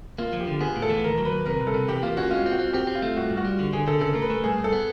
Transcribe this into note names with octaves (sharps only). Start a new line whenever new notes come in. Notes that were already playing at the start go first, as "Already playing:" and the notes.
A#3 F4
F3
G4
D3
B3 G#4
A2
A4
E3
D#2 A#4
F#3
B4
D#2
C3 A#4
C2
A4
C3
E3 G4
A#3 F4
C#4 F#4
G#3 F4
C4
F#4
C4
C4 G4
C4
F4
A3
G2 F#4
G2
F#4
G3
D3
D3 G#4
D3 A4
C#3 A4
A3 A#4
B4
A3
G2 G#4
G2
A4
B3